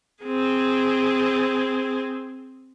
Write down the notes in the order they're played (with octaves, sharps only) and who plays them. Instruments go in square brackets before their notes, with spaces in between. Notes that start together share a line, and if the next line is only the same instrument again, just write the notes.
[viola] C4 G#4